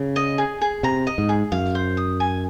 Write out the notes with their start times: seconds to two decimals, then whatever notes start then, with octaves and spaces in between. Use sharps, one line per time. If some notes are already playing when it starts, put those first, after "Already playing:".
Already playing: C#3
0.16 D#5
0.38 G#4
0.61 G#4
0.83 C3 A#5
1.07 D#5
1.18 G#2
1.29 G#4
1.52 F#2 F5
1.75 C5
1.97 D#6
2.20 G#5